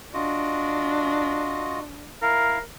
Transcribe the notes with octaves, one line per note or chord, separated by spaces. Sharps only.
D4 F4 F#4 D#5
E4 A#4 F5